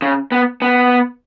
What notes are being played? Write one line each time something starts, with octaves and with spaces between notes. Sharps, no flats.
C#3
B3
B3